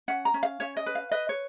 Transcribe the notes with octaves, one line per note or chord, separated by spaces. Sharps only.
C#4 F#5
A#5
C#4
F5
C#4 C#5
D#5
B4
F5
B4 D#5
C#5